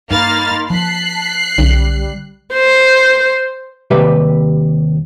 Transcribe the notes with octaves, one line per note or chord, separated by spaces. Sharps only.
G2 A#3 D#4 B5 C6 F6 A6
F3 A5 F#6 B6 C7
B1 D3 G3 C#4
C5
D#2 C3 G3 G4 B4 E5